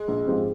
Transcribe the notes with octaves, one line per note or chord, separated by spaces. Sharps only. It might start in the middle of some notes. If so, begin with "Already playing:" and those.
Already playing: G#3
A#1
G#2 F3 C4 G4